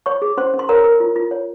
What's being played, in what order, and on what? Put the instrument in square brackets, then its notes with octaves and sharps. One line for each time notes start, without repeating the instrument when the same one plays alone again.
[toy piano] C#5 C#6
G#4
C#4 C5 C6
C#4
C6
A#4 C#5 A#5
A#4
F4
F4
C#5